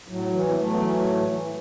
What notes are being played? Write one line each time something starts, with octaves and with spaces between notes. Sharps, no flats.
A2 F#3
E3
B3
A2 F#3 A3
E3
A2
E3